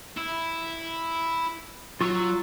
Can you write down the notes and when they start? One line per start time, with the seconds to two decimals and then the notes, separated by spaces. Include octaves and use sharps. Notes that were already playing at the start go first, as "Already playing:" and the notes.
0.17 E4
2.01 F#3 F4 C#5 C#6 E6